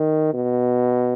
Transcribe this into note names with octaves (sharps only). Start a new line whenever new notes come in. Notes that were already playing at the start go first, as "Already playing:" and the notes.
Already playing: D#3
B2